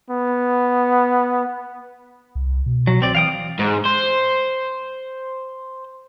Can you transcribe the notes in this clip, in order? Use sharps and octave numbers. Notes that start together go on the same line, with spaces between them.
B3
C2
B2
F#3
C4 D5
E3 F5 G5 D#6
G#2
C5